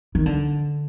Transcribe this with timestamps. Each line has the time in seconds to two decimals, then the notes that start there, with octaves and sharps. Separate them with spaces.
0.15 D#3
0.26 D3